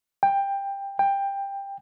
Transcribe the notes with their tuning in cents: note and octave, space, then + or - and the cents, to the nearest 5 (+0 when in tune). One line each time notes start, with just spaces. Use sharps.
G5 +15
G5 +15